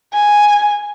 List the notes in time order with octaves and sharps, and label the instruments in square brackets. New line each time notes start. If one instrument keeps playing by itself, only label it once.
[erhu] G#5